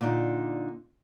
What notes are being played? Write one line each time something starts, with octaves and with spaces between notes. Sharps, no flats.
A#2 D3 D4 D#4